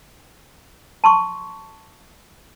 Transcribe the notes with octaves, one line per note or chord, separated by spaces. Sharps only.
A5 C6 C#6